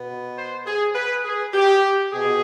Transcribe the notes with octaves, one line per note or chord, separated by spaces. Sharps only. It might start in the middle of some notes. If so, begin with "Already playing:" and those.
Already playing: B2 B3
C5
G#4
B4
G#4
G4
B2 G#4